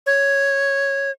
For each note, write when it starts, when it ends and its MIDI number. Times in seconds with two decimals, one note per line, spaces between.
0.06 1.11 73